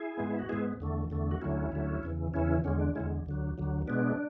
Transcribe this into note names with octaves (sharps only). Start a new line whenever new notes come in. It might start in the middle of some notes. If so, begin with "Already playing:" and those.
Already playing: E4 G#4
G#2 G#3 B3
E4
F#4
G#2 G#3 B3 E4 G#4
E2 D3 A3
E2 D3 A3
F#4
D2 D3 F#3 A3 C#4 E4
D2 D3 F#3 A3
E2 C#3 E3
E2 C#3 E3 C#4 E4
E2 D3 G#3 C#4
D4
E2 D3 G#3 C#4 E4
D2 D3 F#3
D2 D3 F#3
B2 G#3 B3 D4